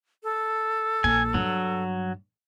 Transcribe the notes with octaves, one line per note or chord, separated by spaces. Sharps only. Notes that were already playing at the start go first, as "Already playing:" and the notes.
A4
A#1 G#5
G2 F#3 G3